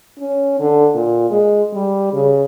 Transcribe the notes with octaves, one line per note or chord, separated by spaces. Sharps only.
C#4
D3
A#2
G#3
G3
C#3